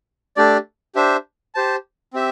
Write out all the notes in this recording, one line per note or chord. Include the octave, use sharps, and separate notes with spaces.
A3 D4 G4 D5
D4 G4 C5 E5
G4 C5 A5
C4 G4 E5